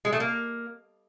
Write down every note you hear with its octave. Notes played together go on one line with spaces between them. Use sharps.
G#3
A3
A#3